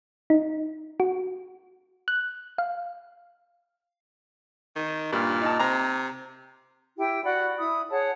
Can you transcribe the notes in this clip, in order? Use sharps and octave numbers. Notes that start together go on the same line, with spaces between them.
D#4
F#4
F#6
F5
D#3
G2 A#2
D#4 A5
C3 A#5
E4 G4 G5
F#4 D5 F#5 B5
E4 B5 D#6
G#4 C#5 F#5 A5